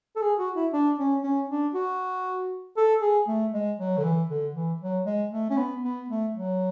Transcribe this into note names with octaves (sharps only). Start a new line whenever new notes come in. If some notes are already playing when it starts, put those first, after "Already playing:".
A4
G#4
F#4
E4
D4
C#4
C#4
D4
F#4
A4
G#4
A3
G#3
F#3
D3
E3
D3
E3
F#3
G#3
A3
C#4
B3
B3
A3
F#3